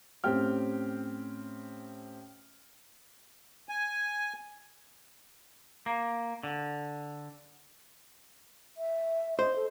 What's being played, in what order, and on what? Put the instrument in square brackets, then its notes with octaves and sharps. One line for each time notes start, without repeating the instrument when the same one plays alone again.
[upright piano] A2 C4 C#4 G4 G5 F6
[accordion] G#5
[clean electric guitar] A#3
D3
[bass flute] E5
[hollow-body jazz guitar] C5 [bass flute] D#5
[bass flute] A4